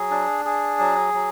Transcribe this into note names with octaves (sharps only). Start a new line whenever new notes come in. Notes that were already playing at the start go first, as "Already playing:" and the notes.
Already playing: F#3 G#4
D4
G#4
F#3
F#3